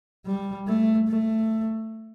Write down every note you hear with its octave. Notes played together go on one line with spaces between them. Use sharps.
G3
A3
A3